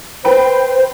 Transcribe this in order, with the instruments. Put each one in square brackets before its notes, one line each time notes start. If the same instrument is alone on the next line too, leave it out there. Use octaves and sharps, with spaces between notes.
[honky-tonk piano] B4 G5 B5 [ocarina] C5